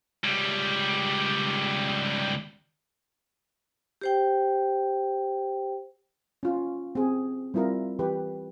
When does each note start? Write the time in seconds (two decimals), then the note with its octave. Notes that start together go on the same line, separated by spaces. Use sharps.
0.24 C#2 G3
4.01 G4 C5 G5
6.43 C#4 F4
6.95 C4 G#4
7.54 G3 C4 E4 F4 A#4
7.99 E3 G4 B4